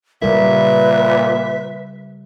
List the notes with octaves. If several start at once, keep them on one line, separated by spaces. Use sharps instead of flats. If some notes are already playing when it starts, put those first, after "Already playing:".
A#2 C#3 G3 A#4 B4 E5